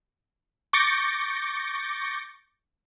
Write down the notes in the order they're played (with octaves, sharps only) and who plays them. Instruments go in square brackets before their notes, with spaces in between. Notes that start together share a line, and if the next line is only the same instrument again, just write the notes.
[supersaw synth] C#6 D6 G6 A6 A#6 C#7